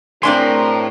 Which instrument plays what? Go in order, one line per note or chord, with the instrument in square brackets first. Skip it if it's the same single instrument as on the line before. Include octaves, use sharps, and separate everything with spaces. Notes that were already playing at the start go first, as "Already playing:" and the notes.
[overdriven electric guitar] A2 [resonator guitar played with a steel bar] C4 D4 G#5 [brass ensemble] E4 G#4 A#4 [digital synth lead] C6